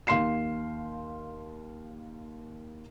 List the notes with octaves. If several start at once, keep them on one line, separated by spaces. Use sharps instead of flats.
D#2 F5 C6 C7 E7